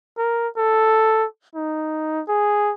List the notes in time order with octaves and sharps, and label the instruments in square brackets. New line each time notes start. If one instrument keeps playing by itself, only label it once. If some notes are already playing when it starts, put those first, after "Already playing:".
[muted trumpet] A#4
A4
D#4
G#4